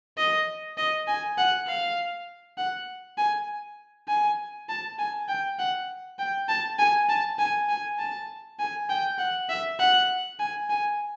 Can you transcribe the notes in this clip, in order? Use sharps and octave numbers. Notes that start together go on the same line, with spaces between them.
D#5
D#5
G#5
F#5
F5
F#5
G#5
G#5
A5
G#5
G5
F#5
G5
A5
G#5
A5
G#5
G#5
A5
G#5
G5
F#5
E5
F#5
G#5
G#5